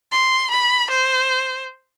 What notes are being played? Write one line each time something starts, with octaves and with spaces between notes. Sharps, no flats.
C6
B5
C5